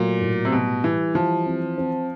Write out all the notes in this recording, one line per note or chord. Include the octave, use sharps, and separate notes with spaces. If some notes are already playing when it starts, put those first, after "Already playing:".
Already playing: A#2 F#3 A3
A2
C3
B2 G3
E3 G3
E3 F3
C4
C4